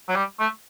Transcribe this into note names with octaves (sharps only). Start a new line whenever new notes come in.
F#3
G3
A3